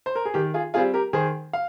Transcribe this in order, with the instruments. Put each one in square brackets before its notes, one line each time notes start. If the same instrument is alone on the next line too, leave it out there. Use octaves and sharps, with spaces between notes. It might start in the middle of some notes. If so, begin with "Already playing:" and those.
[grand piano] C5
A#4
G#4
D#3 G4
F4 G#4
G3 C4 F4 G#4
G4 A#4
D#3 G#4 C5
F5